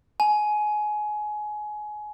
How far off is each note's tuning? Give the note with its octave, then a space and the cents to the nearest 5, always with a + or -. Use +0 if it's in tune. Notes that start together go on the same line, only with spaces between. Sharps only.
G#5 +25